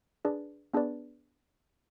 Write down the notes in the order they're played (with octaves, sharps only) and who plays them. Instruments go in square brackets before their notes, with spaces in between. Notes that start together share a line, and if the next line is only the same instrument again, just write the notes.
[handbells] D4 G#4 B4 D5
B3 D4 G#4 B4 D5